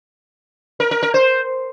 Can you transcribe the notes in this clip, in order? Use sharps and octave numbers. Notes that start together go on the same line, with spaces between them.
A#4
A#4
A#4
C5